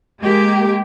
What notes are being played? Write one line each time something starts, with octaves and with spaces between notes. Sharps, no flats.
G#3 A#3 G4